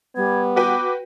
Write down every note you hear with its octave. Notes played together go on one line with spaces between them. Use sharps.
G3 B3 G#6
F#4 B4 G5 D6